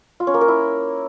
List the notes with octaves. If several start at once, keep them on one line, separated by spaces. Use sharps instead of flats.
F4
C#4
A#3
A#4
E4